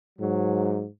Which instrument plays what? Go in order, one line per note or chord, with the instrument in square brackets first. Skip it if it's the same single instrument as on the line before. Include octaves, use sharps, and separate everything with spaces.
[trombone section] G#2 F#3